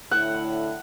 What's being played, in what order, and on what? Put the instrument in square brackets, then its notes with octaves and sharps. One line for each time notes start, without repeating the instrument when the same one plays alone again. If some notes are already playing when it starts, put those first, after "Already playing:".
[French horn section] A2 D3 E4 [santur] F#5